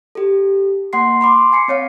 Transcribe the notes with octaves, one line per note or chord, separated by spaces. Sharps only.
G4 A4
A#3 F#5 C6 C7
B5 C6 D6
G#5 C7 C#7
C4 C#5 F5